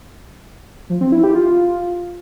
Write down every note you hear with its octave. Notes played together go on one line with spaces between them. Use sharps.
F3
C4
E4
G4
F4